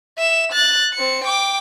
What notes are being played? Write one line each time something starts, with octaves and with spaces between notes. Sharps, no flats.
E5 E7
F#6 A6
C4 C#7
G5 D6